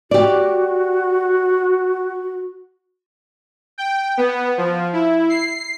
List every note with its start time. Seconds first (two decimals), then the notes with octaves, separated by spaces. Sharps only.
0.11 F#4 G4 D5
3.78 G5
4.17 B3
4.58 F3
4.93 E4
5.30 C7